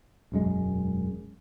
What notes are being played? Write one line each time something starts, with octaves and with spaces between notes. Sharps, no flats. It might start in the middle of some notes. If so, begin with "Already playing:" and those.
E1 F#2 G#3